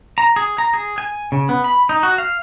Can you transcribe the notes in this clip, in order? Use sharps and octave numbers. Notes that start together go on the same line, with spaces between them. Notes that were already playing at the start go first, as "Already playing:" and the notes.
A#5
G#4
A#5
G#4
G#5
C#3
B3
B5
D#4
F#4
F5